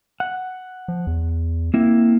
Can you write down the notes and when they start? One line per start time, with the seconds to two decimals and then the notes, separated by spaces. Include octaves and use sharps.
0.20 F#5
0.88 F3
1.07 E2
1.74 A#3 C4 E4